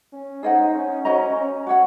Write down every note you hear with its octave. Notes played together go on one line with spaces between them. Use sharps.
C#4
D#4 G#4 C5 D#5 F#5
C#4
C#4 F#4 C5 D#5 A#5
C#4
F#4 C#5 F#5